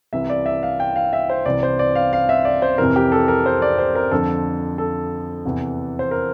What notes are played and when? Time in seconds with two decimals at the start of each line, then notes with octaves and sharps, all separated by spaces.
0.13 C2 C3 E3 E5
0.30 D5
0.46 E5
0.63 F5
0.80 G5
0.96 F5
1.13 E5
1.30 C5
1.46 C2 C3 E3 D5
1.63 C5
1.79 D5
1.95 F5
2.13 F5
2.29 E5
2.45 D5
2.62 C5
2.78 F2 C3 E3 A#4
2.96 G4
3.12 A4
3.28 A#4
3.46 C5
3.62 D5
3.78 C5
3.95 A#4
4.11 F2 D3 F3 A4
4.78 A4
5.45 E2 C3 E3
5.99 C5
6.11 A#4